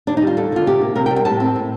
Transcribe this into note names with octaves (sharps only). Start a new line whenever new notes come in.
D#2 D4
D#4
G3 F4
D#2 A4
D3 F4
C3 G4
A#3
C3 A#4
G5
G3
G5
A2 A5
C4
A2